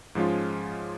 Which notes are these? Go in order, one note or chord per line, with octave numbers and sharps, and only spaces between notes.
G#2 F3 G#3 C#4 F4